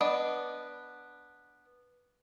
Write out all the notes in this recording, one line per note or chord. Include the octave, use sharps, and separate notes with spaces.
B3 D4 D#5